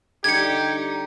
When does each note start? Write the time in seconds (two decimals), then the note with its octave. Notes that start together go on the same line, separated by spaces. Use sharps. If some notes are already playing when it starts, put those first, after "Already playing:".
0.24 D3 G3 D#4 G4 G#6 C#7